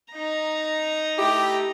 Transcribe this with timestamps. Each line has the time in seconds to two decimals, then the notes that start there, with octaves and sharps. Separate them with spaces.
0.13 D#4 A#5
1.19 A3 E4 G4